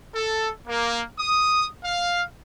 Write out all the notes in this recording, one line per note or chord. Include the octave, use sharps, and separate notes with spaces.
A4
A#3
D#6
F5